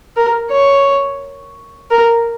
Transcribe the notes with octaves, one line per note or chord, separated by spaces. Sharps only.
A#4
C#5
A#4